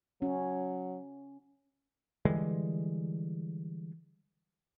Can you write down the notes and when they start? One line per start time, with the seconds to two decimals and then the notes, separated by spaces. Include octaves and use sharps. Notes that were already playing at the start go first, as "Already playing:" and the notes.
0.22 F#3 C#4
2.25 D3 E3 G3 G#3